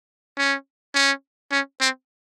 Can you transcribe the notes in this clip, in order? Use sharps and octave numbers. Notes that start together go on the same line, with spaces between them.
C#4
C#4
C#4
C4